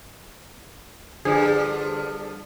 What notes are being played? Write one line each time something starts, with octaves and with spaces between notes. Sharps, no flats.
G2 D3 F3 G#4